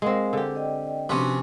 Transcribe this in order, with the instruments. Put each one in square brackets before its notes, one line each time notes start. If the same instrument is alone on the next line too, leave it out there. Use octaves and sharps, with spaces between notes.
[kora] G#3 C4 [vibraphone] A#4 F5 F#5
[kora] D3 G4
[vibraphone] D5 D#5 G5
[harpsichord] C3 F3 [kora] C#4 B4 [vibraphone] D4 F#4